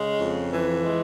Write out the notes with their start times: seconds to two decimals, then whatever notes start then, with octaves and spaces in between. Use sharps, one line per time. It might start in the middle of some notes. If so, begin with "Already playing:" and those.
Already playing: C#3 G#3
0.21 F2
0.53 E3
0.84 G#3